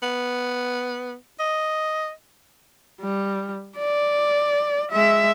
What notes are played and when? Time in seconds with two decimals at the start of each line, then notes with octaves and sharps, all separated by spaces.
0.03 B3
1.40 D#5
3.01 G3
3.78 D5
4.92 G#3 E5